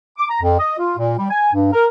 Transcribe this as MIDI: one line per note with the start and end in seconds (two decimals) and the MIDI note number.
0.18 0.26 86
0.30 0.40 82
0.42 0.56 41
0.60 0.79 75
0.79 0.98 65
0.98 1.16 46
1.18 1.28 55
1.31 1.51 80
1.54 1.72 43
1.73 1.87 70